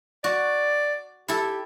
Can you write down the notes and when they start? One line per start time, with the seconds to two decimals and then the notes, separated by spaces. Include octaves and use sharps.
0.24 F#4 D5
1.28 E4 G4 A4